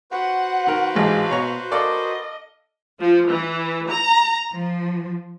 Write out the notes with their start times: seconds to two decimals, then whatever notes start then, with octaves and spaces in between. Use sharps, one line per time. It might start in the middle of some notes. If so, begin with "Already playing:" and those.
0.12 F#4 B4 C5 F#5
0.67 D#3 A#4
0.95 A1 G#2 G#3 F5
1.31 B2 C#5 A#5 C#6
1.71 A4 A#4 D5 D#5 F5
3.00 F3
3.29 E3
3.90 A#5
4.52 F3